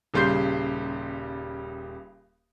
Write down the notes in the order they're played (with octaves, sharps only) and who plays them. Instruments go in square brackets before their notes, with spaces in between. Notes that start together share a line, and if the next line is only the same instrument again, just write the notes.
[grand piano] D#1 C#3 G3 C6 G6 C7